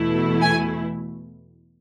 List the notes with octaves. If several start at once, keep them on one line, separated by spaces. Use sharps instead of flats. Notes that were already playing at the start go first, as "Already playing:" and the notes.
Already playing: E2 B2 A3 E4
G#5